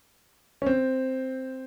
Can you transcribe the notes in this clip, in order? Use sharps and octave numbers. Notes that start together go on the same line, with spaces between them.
C#4
C4